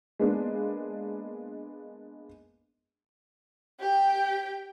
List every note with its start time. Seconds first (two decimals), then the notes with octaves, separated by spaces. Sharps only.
0.19 G#3 A#3 B3 D4
3.80 G4 G5